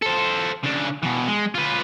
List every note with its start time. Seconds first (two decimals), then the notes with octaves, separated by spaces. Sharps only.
0.02 A4 C5
0.63 C#3 D4
1.03 B2 E3
1.27 G#3
1.55 F4 B4